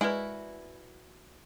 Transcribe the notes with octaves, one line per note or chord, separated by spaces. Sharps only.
G#3 E4 F#4 A#4 B4 D5 G#5